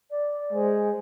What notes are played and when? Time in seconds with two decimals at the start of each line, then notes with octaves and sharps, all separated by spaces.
0.10 D5
0.53 G#3 C5